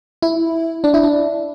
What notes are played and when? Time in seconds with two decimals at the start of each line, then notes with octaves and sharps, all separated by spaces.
0.22 E4
0.84 D4
0.94 E4
1.03 D4